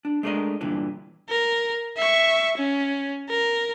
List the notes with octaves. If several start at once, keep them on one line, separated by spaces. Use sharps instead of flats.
D4
G#3 A3 D4 G#4 A#4 D#5
G2 A#2 D3 E3
A#4
E5 C#6
C#4
A#4